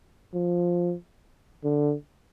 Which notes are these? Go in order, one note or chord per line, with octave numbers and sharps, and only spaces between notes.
F3
D3